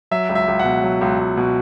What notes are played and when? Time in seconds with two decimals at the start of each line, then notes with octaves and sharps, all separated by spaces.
0.11 F#3 E5
0.29 C#2
0.35 E5
0.48 C#2
0.59 F#5
0.65 B2
0.83 F#3
1.01 C#2
1.18 C#2
1.37 B2